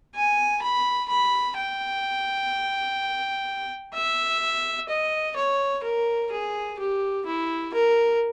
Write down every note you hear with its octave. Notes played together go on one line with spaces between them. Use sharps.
G#5
B5
B5
G5
E5
D#5
C#5
A#4
G#4
G4
E4
A#4